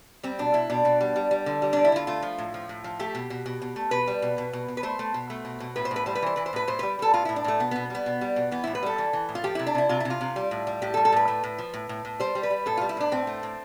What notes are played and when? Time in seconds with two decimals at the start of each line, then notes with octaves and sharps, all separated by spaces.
0.23 G3 C4
0.39 B2 D4
0.54 B2 E4
0.70 B2 D4
0.85 B2
1.01 G3
1.16 G3
1.31 G3
1.46 D3
1.62 G3
1.73 D3 D4
1.85 E4
1.92 D3 F4
2.07 A3 F4
2.22 F3
2.38 A2
2.54 F3
2.69 A2
2.84 F3
2.99 A3 G4
3.15 B2
3.30 B2
3.46 B2
3.62 B2
3.76 A3
3.91 B2 B4
4.07 G3
4.22 B2
4.38 B2
4.53 B2
4.68 B2
4.77 B4
4.83 A3 C5
4.99 A3
5.14 B2
5.30 A3
5.45 B2
5.60 B2
5.76 A2 B4
5.85 C5
5.91 A2
5.96 B4
6.06 G3 C5
6.15 B4
6.22 E3 C5
6.36 E3 B4
6.46 C5
6.53 A2 B4
6.68 A2 C5
6.79 G3 B4
6.99 G3 A4
7.14 A2 F4
7.25 A2 E4
7.36 D4
7.44 A2 A3
7.60 B2 B3
7.71 B2 B3
7.90 G3 B3
8.06 B2
8.21 G3
8.36 B2
8.51 E3 B3
8.64 A2 E4
8.75 B4
8.83 G3 A4
8.98 E3
9.13 E3
9.29 A2
9.35 F4
9.44 F3 G4
9.55 C3 E4
9.67 D4
9.75 C3 E4
9.89 C3 F4
10.00 C3 E4
10.10 F4
10.21 C3
10.36 G3
10.51 A2
10.67 G3
10.82 A2 G4
10.94 A4
10.97 G3
11.05 A4
11.12 A2 B4
11.28 A3
11.44 A2
11.58 F3
11.74 A2
11.89 A2
12.05 A2
12.20 G3 C5
12.35 G3
12.43 B4
12.50 G3
12.66 A2 A4
12.77 G3 F4
12.89 E4
12.97 A2 D4
13.12 A2 C4
13.27 A3
13.43 A2